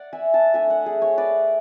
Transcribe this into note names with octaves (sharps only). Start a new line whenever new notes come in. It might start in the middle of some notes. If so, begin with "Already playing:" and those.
Already playing: D5 F#5
E5 G#5
F#5 A5
A3 D4 E5 G#5
D5 F#5
G#4
C#5 E5
B4 D5